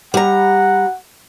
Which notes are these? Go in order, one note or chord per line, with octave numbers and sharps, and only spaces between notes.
G3 F#5 A#5